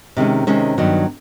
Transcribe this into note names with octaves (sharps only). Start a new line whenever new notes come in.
C3 D#3 G#3 C#4
C3 D#3 G#3 C#4
G2 D#3 F#3 B3